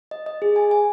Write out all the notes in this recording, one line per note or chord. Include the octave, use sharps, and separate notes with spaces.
D#5
D#5
G#4
G#5
G#5